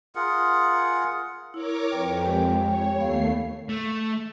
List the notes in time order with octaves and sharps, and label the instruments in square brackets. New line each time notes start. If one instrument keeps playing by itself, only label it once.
[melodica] F4 G#4 A#4 F#5
[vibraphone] E4 [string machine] A#4 C#5 D6
[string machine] F2 [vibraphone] B4 G5
[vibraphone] G#3 G4 G5
[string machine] C#5
[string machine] D#2 A3 C7 [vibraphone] B3 F5
[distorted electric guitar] A3